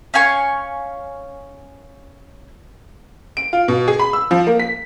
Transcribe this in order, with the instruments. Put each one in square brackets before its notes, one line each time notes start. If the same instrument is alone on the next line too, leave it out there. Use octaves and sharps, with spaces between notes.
[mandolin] C#4 F5 G#5 C#6
[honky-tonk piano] D7
F4
B2
G#4
B5
E6
F3
A#3
B6